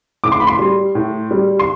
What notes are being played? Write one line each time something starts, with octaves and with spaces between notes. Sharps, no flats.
A2 D6
C6
B5
C6
G3
A2
G3
C6